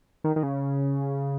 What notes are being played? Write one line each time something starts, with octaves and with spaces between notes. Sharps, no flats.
D#3
D#3
C#3